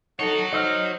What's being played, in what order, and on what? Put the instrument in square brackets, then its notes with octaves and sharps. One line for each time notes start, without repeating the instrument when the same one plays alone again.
[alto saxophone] D#4 [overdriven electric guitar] F#4 C#5 [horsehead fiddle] A4 F#5
[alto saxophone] D#4 [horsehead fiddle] C5 [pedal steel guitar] D#5 E6 F6